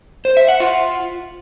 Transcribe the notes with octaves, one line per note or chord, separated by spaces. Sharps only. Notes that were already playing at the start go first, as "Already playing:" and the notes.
C5
E5
F#5
F4